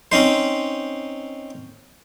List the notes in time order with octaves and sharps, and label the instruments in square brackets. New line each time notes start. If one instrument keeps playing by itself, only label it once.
[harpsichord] C4 C#4 D#4 C5